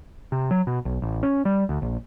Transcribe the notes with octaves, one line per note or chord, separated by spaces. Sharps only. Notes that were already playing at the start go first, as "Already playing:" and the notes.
C3
F#3
B2
B1
A1
C#4
G3
D2
A#1